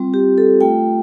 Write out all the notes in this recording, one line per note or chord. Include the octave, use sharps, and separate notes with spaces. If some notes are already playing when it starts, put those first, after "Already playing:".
Already playing: G3 C4 F4
G4
A4
A3 F4 G5